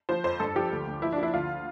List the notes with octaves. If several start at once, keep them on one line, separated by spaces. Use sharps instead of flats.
F3 C5
F2 C5
G2 A4
F3 G4
D2
D2
F3 E4
D4
F3 E4
D2 F4